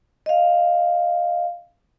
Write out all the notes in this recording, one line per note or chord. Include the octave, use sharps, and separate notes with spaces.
D#5 F5